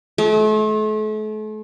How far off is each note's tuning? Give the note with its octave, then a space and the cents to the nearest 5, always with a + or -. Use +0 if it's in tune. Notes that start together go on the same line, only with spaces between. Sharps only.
A3 -40